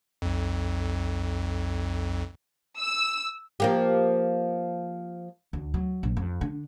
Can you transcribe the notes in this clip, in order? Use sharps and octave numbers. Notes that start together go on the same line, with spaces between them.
B1 F2
E6
F3 A#3 G4
D2
F#3
A#1
F2
D3